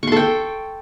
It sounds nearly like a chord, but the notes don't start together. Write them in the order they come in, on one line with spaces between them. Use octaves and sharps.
C#6 C6 A4 G5